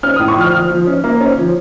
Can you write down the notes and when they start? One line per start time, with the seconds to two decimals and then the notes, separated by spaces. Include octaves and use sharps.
0.03 C#4 F6
0.16 A2 D#6
0.28 C#6
0.36 F3 F6
0.53 F3 F6
0.71 F3
0.87 C#4
1.04 A#3
1.21 C#4
1.38 F3